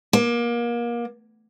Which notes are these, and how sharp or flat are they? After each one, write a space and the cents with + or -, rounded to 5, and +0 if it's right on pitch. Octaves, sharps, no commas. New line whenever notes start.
A#3 +30